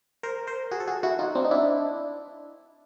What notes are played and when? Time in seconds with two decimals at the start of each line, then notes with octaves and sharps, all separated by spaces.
0.23 A#4 C5
0.47 A#4 C5
0.71 F#4 G#4
0.80 A4
0.87 F#4 G#4
1.03 E4 F#4
1.19 D#4 F4
1.35 C4 D4
1.45 D#4
1.51 D4 E4